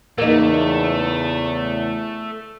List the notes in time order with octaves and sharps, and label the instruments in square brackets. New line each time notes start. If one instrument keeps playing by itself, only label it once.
[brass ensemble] E2 C#3 [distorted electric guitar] A3 [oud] A#3 D#4